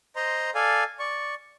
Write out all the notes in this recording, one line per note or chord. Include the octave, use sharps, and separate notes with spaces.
C5 D#5 A#5 C6
A4 D5 F5 G#5
D5 C#6